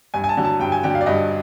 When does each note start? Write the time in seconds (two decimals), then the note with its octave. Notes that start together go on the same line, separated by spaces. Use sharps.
0.14 G2 G#5
0.24 G#5
0.29 A5
0.37 D3 F#3
0.45 A5
0.60 G2 G5
0.72 G#5
0.83 D3 F#3 G5
0.95 F5
1.01 D5
1.06 G2 D#5